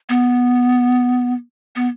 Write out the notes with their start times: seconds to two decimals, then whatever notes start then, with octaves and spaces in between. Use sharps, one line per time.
0.09 B3
1.76 B3